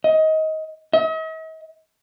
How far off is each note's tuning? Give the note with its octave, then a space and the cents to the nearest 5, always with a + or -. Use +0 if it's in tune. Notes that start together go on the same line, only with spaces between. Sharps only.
D#5 +20
D#5 +45